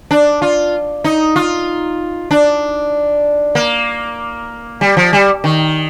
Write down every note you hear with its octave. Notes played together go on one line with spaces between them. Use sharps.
D4
F4
D#4
F4
D4
A#3
G3
F3
G3
D#3